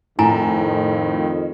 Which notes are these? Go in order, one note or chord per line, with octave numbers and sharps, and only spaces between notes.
F2 A2 D#3 E4 G#5 A#5